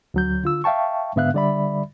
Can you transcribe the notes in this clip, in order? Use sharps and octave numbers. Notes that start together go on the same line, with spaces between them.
D2 F#3 G6
D3 F4 E6
E5 F5 G5 A5 C#6
G#2 D3 B3 E5 F5 F#6
D3 G3 D5 E5 B5